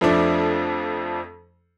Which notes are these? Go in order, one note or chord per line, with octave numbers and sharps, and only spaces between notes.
F2 F3 A3 D4